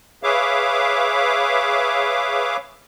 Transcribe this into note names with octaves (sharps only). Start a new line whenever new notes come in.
G#4 B4 C#5 E5 F5 D6